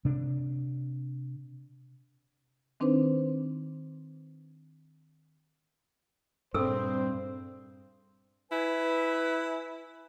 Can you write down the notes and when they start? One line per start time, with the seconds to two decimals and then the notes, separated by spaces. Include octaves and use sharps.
0.05 C3 D4
2.80 D#3 C4 D4 D#4 B4 C5
6.54 G2 A#2 G3 C4 G#4 A4 C5 E6
8.52 E4 B4 G#5